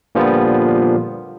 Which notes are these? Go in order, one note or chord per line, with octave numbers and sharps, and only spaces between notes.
A#2 D3 F3 G3 B3 F4